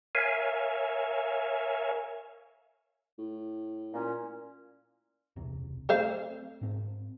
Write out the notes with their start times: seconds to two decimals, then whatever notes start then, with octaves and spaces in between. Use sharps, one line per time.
0.15 A#4 C#5 E5 F5 G#5
3.19 A2
3.93 A#2 C#4
5.36 E1 C#2 C3
5.89 F#3 A3 C4 A4 C5 F5
6.61 G#2 C4